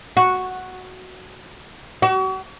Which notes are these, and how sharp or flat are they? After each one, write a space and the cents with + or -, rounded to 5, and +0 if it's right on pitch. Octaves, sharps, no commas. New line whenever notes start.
F#4 +0
F#4 +40